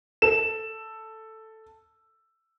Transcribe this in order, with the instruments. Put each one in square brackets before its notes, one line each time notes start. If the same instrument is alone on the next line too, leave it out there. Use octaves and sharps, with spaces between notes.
[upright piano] A4 E7